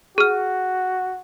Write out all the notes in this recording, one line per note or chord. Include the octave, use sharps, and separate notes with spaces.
F#4 G#4 F6